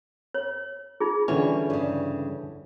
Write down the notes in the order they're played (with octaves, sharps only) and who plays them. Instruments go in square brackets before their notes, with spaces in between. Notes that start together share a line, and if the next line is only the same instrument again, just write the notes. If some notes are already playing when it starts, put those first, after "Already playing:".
[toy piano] C#5
D#4 F4 G#4
[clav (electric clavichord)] D3 E3 C#4 [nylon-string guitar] G3 C#5
[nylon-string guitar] G2 C#3